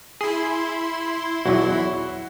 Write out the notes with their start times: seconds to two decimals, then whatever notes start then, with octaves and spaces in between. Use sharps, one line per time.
0.21 E4 G#4 C6
1.46 B1 E2 F#3 F#4